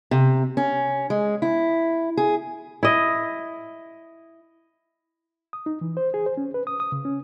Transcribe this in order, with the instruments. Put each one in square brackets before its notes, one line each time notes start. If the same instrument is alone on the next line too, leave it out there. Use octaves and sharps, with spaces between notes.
[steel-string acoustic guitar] C3
C#4
G#3
E4
G#4
[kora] E4 D#5
[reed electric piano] D#6
D#4
E3
C5
G#4
C5
C#4
B4
D#6
D#6
C#3
C#4